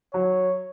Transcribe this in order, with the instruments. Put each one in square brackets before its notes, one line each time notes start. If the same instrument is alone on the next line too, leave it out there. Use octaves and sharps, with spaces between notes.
[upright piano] F#3 [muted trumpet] C#5